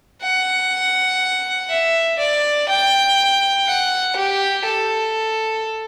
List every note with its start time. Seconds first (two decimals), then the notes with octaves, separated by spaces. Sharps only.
0.22 F#5
1.69 E5
2.19 D5
2.69 G5
3.67 F#5
4.16 G4
4.65 A4